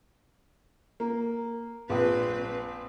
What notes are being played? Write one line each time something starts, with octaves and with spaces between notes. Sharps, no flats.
A#3
A#1 C4 B4